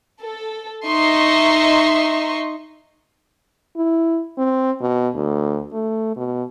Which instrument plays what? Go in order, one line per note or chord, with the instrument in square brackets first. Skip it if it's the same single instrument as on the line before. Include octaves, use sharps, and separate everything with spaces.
[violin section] A4
D#4 D#5 E5 C6 C#6
[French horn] E4
C4
B2
D2
A3
B2